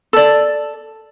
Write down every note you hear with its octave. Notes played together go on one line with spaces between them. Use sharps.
A4 D5